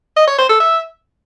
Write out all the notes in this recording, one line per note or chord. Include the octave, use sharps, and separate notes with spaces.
D#5
C#5
C5
A4
E5